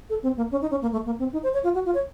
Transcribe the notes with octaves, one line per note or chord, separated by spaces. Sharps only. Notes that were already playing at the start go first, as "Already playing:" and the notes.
A4
C4
A#3
C#4
D#4
C#4
A#3
A3
A#3
C4
D#4
C5
C#5
F4
F#4
F4
C#5